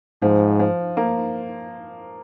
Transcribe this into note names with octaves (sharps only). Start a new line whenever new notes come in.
G#2 F3
F3
A#3